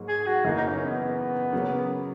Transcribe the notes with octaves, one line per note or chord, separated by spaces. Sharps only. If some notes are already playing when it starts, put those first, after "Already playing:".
Already playing: G#2 F#3 A#3
G#4
F#4
F#2 C#3 E3 A#3 D#4
D#4
B3
C#4
B3
C#3 F#3 A#3